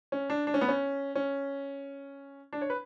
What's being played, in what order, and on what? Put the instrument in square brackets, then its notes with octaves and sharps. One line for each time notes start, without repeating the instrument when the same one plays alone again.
[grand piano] C#4
D4
D4
C#4
B3
C#4
C#4
D4
C#5
B4